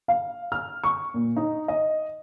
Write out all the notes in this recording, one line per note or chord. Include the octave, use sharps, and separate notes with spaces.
F5
F6
C#6
A#2
D#4
D#5